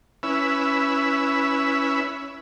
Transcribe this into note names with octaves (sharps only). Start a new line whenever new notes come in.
C#4 E4 B4 E5